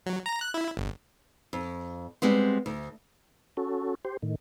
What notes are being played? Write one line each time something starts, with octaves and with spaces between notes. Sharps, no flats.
F#3
A#5
F#6
E4
G1
F2
G3 G#3 B3 C4
D2
C#4 F#4 A4
G4 C5
A2 D#3